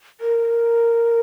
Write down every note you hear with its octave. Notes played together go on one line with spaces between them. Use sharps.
A#4